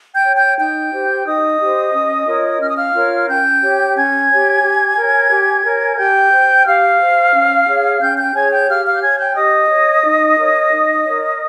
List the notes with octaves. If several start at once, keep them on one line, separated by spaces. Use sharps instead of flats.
G5 G6
C#5
G5 G6
D#4 G5 G6
G4 C5
D#4 D#5 D#6
G4 C5
C#4
F4 A#4 C#5
C#4 F6
D#6
F5 F6
F4 A#4 C#5
C#4 G5 G6
G4 C#5
C#4 G#5 G#6
G4 C#5
G4
A#4 C#5
G4
A#4 C#5
G4 G5 G6
C5
G4 F5 F6
C5
C#4
G#4 C#5
C#4 G5 G6
G5 G6
G#4 C#5 G#5 G#6
G5 G6
G4 F5 F6
F5 F6
G6
C#5 G#5 G#6
G5 G6
G4 D#5 D#6
C#5
D#4
A#4 C#5
D#4
A#4 C#5